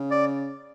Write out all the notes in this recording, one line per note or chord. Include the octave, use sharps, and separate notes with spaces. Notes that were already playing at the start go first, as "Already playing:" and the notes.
Already playing: C#3
D5